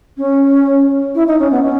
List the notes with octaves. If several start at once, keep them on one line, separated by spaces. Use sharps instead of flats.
C#4
E4
D#4
C#4
B3
C#4